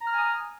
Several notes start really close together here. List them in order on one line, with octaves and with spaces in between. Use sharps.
A#5 F6 G#5 D#6